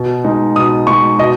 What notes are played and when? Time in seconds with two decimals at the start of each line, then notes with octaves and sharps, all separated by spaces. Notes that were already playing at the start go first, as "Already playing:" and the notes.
Already playing: B2
0.24 G#3 D#4
0.56 B2 D#6
0.87 G#3 D#4 C#6
1.19 B2 D#5